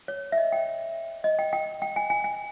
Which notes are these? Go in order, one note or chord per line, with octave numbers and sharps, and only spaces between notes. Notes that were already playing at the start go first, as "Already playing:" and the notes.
C#5
E5
D#5
G5
D#5
G5
G5
G5
G#5
G#5
G#5